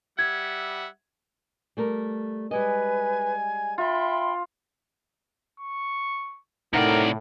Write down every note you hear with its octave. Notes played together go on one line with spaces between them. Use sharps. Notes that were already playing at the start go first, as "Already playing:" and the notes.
G3 E5 F#5 G#6
G3 A3 A#4
G3 G#3 B4 D#5 G#5
F4 E5 G5 B5 C6
C#6
A2 C3 D#4 A#4 D5 F#5 G5